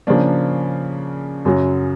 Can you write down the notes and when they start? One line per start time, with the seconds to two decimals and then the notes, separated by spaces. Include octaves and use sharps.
0.07 C#3 F3 A#3 D4
1.45 F#2 C#3 F#3